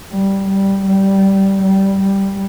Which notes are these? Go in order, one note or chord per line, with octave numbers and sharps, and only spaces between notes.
G3
G3
G3
G3
G3